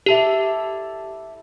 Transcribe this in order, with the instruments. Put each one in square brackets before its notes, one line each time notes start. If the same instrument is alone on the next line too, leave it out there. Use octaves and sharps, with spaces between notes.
[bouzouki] E4 A4 D5 [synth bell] G4